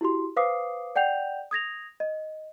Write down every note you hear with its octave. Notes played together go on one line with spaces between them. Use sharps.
E4 F#4 G4 C6
B4 C5 F5 D6 D#6 C7
D5 F#5 G5 G6 F7
D#6 G#6 A#6 F7
D#5